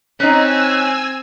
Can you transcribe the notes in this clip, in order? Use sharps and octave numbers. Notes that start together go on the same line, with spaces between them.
C4 C#4 D#4 G#5 E6 F#6